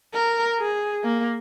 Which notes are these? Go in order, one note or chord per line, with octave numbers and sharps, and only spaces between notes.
A#4
G#4
A#3